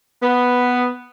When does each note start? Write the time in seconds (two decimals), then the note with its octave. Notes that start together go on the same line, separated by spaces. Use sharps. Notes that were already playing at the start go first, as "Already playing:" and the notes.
0.23 B3